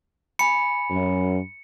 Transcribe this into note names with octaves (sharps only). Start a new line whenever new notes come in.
G#5 B5 C#7
F#2